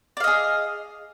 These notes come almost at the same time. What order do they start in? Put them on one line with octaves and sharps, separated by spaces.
D5 F5 D#5 G#4